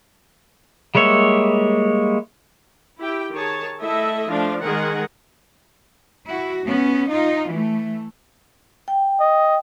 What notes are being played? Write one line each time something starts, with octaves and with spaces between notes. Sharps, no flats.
G3 G#3 A#3 C#5 E5
E4 G4 G5
D#3 G#4 C#5 A5
A3 E4 A4 D#5 E5
F3 A3 D4 F5
D#3 G#3 G#4 A#4 F#5
E4 F#4
B3 C#4
D#4 F4
E3 A3
G5
D#5